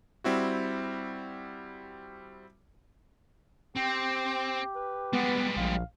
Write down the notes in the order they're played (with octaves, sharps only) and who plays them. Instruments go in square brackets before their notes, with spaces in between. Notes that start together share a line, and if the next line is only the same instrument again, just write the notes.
[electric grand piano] G3 C4 E4 F#4
[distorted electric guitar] C4 [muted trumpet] G4 [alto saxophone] G5
[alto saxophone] B4
[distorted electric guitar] G3 G#3 [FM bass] B3
[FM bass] A#1 [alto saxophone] F5